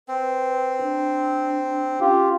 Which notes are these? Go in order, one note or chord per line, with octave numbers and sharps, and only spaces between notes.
C4 B4
D4
C#4 F4 G4